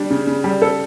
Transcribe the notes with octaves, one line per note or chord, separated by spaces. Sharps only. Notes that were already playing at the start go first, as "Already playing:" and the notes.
Already playing: G3 D4
C#3
C#3
G3
A4